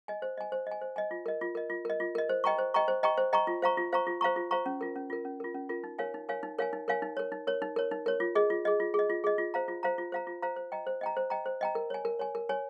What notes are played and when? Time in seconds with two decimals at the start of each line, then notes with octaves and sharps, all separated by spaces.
0.08 D#5 G#5
0.22 C5
0.37 D#5 G#5
0.52 C5
0.67 D#5 G#5
0.81 C5
0.96 D#5 G#5
1.11 F4
1.26 A#4 D#5
1.41 F4
1.55 A#4 D#5
1.70 F4
1.85 A#4 D#5
2.00 F4
2.15 A#4 D#5
2.29 C5
2.44 D#5 G5 A#5 C#6
2.59 C5
2.74 D#5 G5 A#5 C#6
2.88 C5
3.03 D#5 G5 A#5 C#6
3.17 C5
3.33 D#5 G5 A#5 C#6
3.47 F4
3.62 C5 F5 A#5 C#6
3.77 F4
3.92 C5 F5 A#5 C#6
4.07 F4
4.21 C5 F5 A#5 C#6
4.36 F4
4.51 C5 F5 A#5 C#6
4.66 C#4
4.81 F4 A#4
4.95 C#4
5.10 F4 A#4
5.25 C#4
5.40 F4 A#4
5.54 C#4
5.69 F4 A#4
5.84 D#4
5.99 A#4 C#5 F5 G#5
6.14 D#4
6.29 A#4 C#5 F5 G#5
6.43 D#4
6.58 A#4 C#5 F5 G#5
6.73 D#4
6.88 A#4 C#5 F5 G#5
7.02 D#4
7.17 A#4 C#5
7.32 D#4
7.47 A#4 C#5
7.62 D#4
7.76 A#4 C#5
7.91 D#4
8.06 A#4 C#5
8.20 F4
8.35 G#4 D#5
8.50 F4
8.65 G#4 D#5
8.80 F4
8.94 G#4
8.99 D#5
9.10 F4
9.24 G#4 D#5
9.38 F4
9.54 C5 F5 A#5
9.68 F4
9.83 C5 F5 A#5
9.98 F4
10.12 C5 F5 A#5
10.27 F4
10.42 C5 F5 A#5
10.56 C5
10.72 D#5 G5 A#5
10.87 C5
11.01 D#5 G5 A#5
11.17 C5
11.30 D#5 G5 A#5
11.46 C5
11.61 D#5 G5 A#5
11.75 A#4
11.90 C#5 G#5
12.05 A#4
12.19 C#5 G#5
12.35 A#4
12.49 C#5 G#5